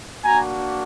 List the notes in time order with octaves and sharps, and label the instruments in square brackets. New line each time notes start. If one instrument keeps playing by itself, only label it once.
[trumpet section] A#3 D4 F#4 G#5 A#5